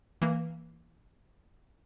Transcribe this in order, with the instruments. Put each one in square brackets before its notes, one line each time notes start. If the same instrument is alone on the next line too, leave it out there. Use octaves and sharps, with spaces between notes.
[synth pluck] E3 A#3